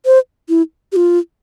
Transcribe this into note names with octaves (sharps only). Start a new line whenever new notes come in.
C5
E4
G4
F4